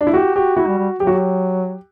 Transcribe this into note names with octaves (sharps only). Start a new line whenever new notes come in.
D4
E4
F#4 G4
F#4 G4
E4 F#4
G3
G3
F#3 G4
F#4
G4